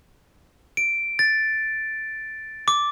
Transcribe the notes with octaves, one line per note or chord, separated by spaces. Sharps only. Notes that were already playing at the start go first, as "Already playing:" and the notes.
D7
A6
D6